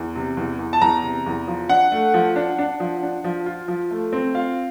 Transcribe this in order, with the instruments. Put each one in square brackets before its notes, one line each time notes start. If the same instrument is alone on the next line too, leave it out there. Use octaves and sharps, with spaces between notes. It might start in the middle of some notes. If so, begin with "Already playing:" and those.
Already playing: [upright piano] E2
C3
E2
E2
[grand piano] A5
[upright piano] E2 [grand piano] A#5
[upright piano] C3
E2
F3
[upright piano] D4 [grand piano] F#5
[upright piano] A3
F3
D4
D4
F3
D4
F3
F4
F3
A3
C4
[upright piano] F4 [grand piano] F5